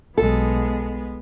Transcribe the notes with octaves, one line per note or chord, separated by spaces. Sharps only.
B1 G#3 B3 A4